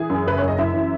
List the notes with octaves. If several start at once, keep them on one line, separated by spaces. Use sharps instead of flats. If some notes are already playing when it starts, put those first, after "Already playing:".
Already playing: E3 G#4 G#5
F#2
F#1 B4
F#2 C#5
D#5
F#2 E4 E5
E3